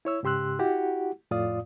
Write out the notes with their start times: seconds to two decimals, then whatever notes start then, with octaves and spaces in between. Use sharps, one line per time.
0.05 E4 C#5 E6
0.23 G#2 C#3 G4 C6 E6 F#6
0.59 E4 F#4 G4 F#5
1.31 F2 A2 F4 D5 F5 D#6